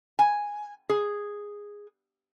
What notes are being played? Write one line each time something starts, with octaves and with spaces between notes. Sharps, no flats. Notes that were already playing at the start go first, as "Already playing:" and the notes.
G#5
G#4